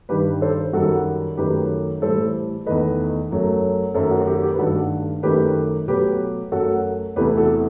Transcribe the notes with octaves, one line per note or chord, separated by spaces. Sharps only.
G2 D#3 G3 G4 B4
A4 C5
F#2 D#3 G3 F#4 A4
F#2 D#3 F#3 A3 G4 B4
A2 E3 G3 A4 C5
E2 D#3 A3 B4 D#5
F#2 F#3 A3
F#2 D#3 A3 A4 C5
F#4 A4
F#4
G4
G4
B4
G2 D#3 A3 F#4 A4
F#2 D#3 A3 G4 B4
B2 F#3 A3 G4 B4
F#2 F#3 A3 F#4 A4
E2 C3 E3 A3 G4 B4
F#4 A4